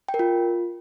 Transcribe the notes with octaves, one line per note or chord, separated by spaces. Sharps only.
G5
A#4
F4